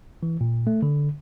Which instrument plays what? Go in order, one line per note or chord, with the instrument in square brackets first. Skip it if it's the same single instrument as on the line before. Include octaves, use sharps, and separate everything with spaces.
[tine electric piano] E3
A#2
A3
D3